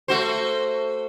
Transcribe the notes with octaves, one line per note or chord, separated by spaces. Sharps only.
A3 F#4 C5